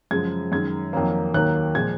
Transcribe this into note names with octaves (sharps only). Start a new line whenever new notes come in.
F#2 C#3 F3 G#3 G#6
F#2 D#3 G#3 G#6
F2 D#3 F#3 A#3
D#2 D#3 F#3 A#3 F#6
A#2 F3 G#3 G#6